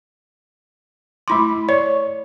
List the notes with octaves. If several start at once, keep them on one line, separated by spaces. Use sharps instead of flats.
A3 E4 B5 C6 D6
C#5 D5